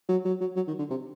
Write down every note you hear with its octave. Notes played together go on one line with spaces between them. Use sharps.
F#3
F#3
F#3
F#3
D#3
D3
C3